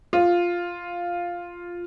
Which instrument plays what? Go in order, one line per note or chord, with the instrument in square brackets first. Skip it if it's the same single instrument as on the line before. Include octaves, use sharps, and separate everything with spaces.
[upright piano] F4